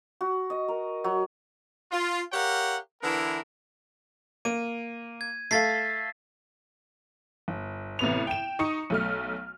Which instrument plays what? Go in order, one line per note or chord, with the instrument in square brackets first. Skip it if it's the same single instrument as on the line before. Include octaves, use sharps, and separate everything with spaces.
[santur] F#4
D#5
A#4
F#3
[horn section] F4
G4 A#4 C#5 F5 F#5
D3 E3 B3 E4 A#4
[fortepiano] A#3 [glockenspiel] D#7
[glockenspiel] G#6
[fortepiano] A3 A4 F5 [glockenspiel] A6 B6 C7
[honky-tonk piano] G1
A1 C3 B3 F7
G5 E7
D#4 C#6 D#6 C#7
B1 A3 F6